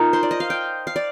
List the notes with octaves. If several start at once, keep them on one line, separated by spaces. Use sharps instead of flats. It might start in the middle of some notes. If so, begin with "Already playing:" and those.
Already playing: D#4 F4 A#4
C5
D5
D#5
F5
G5
F5
D5